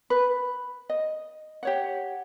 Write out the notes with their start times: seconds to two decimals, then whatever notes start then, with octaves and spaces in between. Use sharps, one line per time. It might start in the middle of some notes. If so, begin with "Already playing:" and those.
0.10 B4
0.90 D#5
1.63 G4 C#5 F#5